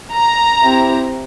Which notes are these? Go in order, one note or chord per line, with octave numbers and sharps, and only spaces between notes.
A#5
C4 E4 G4